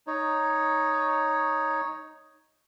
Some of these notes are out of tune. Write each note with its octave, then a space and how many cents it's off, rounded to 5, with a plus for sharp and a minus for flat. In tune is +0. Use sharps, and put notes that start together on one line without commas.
D#4 +0 C#5 +0